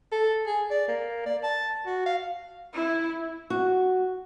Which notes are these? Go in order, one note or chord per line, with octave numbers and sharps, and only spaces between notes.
A4
G#4
D5
A#3
D5
A5
F#4
F5
E4
F#4